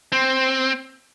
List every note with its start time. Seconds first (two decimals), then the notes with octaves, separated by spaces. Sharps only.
0.12 C4